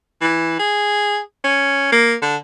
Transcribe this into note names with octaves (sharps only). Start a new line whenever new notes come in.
E3
G#4
C#4
A#3
D3